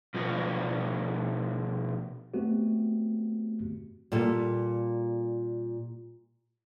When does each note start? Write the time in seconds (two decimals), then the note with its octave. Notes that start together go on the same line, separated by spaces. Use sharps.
0.14 B2 F3 D4 F#4 A#4
2.34 A3 B3 C4 F#4 G4
4.12 A#2 G3 A4